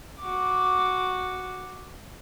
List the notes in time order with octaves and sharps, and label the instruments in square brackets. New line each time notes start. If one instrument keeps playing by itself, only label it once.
[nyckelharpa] F#4 D6